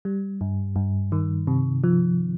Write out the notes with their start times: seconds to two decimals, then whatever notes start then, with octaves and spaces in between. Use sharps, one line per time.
0.05 G3
0.41 G2
0.76 G2
1.12 D#3
1.47 C3
1.84 F3